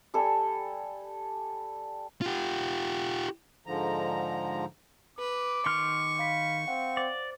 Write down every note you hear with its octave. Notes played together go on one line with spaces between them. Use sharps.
G3 A4 G#5 E6
F4 G4
G#2 D3 F3 A#5
B4 D6
D#3 C6 C#6 F6
F5 B5 B6
C4 F5 F#5
C5 D5